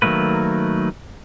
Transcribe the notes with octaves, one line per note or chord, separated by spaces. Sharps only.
D#3 F#3 A3 A#3 B4